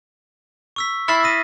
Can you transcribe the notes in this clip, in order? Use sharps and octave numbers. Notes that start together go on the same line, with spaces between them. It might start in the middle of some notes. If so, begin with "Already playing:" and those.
C#6 E6 B6
E4 E5 F6 A6 C7
D#6 A#6 D#7